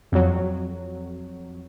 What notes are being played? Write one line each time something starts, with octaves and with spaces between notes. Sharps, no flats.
F2 F#3